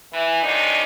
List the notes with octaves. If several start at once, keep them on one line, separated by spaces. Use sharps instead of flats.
E3
F#2 C3 D4 D#4